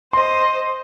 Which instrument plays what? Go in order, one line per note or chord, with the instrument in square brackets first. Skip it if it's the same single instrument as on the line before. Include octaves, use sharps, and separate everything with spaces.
[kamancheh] C5 D#5 [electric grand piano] C6